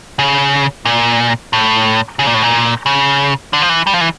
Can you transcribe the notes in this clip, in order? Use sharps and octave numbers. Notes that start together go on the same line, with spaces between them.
C#3
A#2
A2
C#3
A#2
A2
A#2
C#3
D3
F3
E3
G3
F3
E3